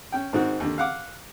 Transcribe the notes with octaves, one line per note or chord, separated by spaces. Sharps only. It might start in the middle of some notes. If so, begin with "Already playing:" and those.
C#4 G5
G#2 D#3 C4 F#4
D#2 D3
F5 F#5 D6